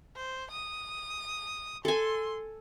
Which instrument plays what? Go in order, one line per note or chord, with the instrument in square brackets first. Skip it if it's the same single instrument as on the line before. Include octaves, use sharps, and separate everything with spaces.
[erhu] C5
D#6
[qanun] A4 G#5 [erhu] C6